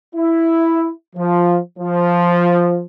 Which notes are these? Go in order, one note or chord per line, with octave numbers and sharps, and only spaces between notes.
E4
F3
F3